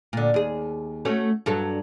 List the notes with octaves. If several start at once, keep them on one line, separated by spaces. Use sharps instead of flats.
A#2 D3
D#2 G#4
A3 C#4 F#4
G2 F#3 A4